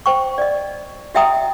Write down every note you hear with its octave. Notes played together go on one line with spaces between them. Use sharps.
C5 G5 C#6
D5 D#5
F#4 D#5 E5 G5 A#5 D#6